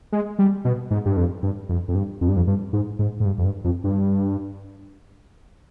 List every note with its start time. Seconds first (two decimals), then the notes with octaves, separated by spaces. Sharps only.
0.12 G#3
0.39 G3
0.65 B2
0.91 G#2
1.06 G2
1.17 F2
1.43 G2
1.69 F2
1.88 F2
1.95 G2
2.21 F2
2.29 G2
2.36 F2
2.47 G2
2.73 G#2
2.99 G#2
3.20 G#2
3.25 G2
3.38 F2
3.45 G2
3.64 F2
3.84 G2